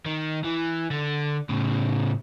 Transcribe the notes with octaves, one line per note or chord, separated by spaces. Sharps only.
D#3
E3
D3
A2 C#3